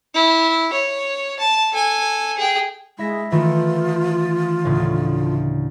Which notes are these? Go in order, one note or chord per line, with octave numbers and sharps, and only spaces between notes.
E4
C#5
A5
A4 G#5
G#4 G5
G#3 E4 E5 A#6
D#3 E3 A3 F4
D2 A2 C#3